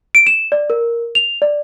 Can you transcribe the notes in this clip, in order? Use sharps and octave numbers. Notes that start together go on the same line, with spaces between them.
D7
E7
D5
A#4
F7
D5